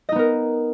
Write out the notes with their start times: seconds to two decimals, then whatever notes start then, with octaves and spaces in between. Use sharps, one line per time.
0.09 D#5
0.12 D#4
0.16 B3
0.19 A#4